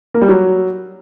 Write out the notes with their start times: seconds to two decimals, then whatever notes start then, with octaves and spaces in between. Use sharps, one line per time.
0.14 A#3
0.21 G3
0.28 F#3